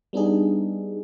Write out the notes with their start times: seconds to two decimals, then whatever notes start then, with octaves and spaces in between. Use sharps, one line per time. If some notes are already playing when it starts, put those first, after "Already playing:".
0.13 G3 B3 D4 D#4 G#4